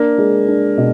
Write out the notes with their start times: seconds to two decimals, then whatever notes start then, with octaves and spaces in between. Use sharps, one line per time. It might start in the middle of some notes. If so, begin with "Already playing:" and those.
Already playing: A#3 D4
0.18 G#3
0.48 D4
0.77 B2